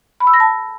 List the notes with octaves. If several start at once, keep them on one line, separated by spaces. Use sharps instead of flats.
B5
E6
A#6
A5